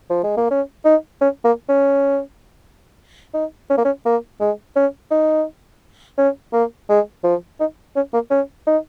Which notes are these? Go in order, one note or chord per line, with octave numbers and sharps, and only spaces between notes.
F3
G#3
A#3
C#4
D#4
C#4
A#3
C#4
D#4
C#4
A#3
C#4
A#3
G#3
C#4
D#4
C#4
A#3
G#3
F3
D#4
C#4
A#3
C#4
D#4